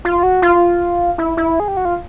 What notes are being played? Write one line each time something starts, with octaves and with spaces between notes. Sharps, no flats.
F4
F#4
F4
E4
E4
G#4
G4
F#4
F4